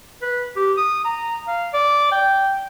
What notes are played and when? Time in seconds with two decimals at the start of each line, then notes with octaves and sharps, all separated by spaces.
0.22 B4
0.57 G4
0.77 D#6
1.05 A#5
1.48 F5
1.73 D5
2.12 G5